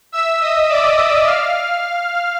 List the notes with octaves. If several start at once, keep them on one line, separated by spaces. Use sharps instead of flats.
E5 E6
D#5 D#6
D5 D6
D#5 D#6
F5 F6